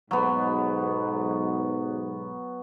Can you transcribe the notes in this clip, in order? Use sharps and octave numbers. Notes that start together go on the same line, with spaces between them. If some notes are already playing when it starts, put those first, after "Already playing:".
B1 G#2 F#3 B3